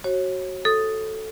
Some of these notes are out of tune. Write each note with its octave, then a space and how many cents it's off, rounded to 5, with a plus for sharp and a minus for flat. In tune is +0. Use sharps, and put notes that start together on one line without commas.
F#4 +15 C#5 -30
A4 +0 D#6 +0